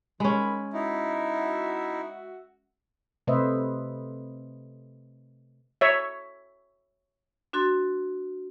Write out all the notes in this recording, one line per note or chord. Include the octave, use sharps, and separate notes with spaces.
D#3 G#3 C#4 B5
D#4 E4 F#4 E5
C3 A3 B4 C5 D#5 E5
C#5 E5
D4 F#4 C6 A6